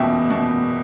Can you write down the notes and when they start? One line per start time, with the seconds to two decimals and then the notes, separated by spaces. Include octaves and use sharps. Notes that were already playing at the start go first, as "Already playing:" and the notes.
Already playing: F#1 E2 B2 E5 G5
0.30 B2